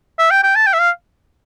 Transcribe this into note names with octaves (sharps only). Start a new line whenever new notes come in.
E5
G5
G5
A5
G5
E5
F5